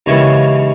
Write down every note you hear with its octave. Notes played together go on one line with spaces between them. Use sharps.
D#2 C#3 E3 G#3 C#4